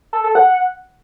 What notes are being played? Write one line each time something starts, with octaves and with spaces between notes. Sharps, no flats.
A4
A4
F#5